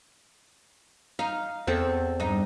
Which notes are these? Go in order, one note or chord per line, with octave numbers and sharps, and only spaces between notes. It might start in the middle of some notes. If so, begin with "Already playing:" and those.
D#4 F5
E2 C4 A4
G2 D#4